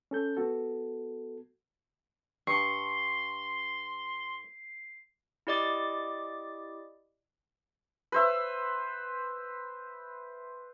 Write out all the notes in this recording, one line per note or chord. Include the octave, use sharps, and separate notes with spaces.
C#4 A4 G6
B3 F#4 A4
G2 C6 C#6 C7
E4 G4 D5 D#5 D6 A6
B4 C5 E5